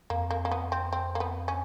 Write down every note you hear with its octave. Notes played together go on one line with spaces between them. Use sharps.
F2 A#3
A#3
A#3
B3
C4
C4
A#3
B3
C#4